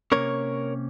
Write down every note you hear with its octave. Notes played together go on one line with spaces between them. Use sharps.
C3 F3 A#3 C#4 A#4 C#5